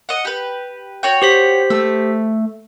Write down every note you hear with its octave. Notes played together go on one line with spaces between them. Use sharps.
D#5 F#5
G4 B4
F#4 C#5 G5
G4 C5 B6
A3 E6